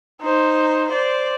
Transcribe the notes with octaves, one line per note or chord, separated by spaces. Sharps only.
D#4 C5
C5 D5